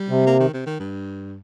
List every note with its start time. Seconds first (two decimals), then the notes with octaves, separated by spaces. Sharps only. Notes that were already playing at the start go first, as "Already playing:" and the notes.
Already playing: G3
0.09 C3
0.27 A#3
0.40 D#3
0.54 C3
0.66 D#3
0.80 G2